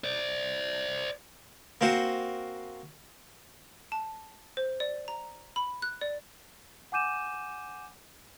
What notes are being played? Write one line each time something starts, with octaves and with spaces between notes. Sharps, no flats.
C5 D5
A#3 C4 F#4 C5 F#5
A5
C5
D5
A#5
B5
F#6
D5
F#5 G#5 D6 G6 D#7 E7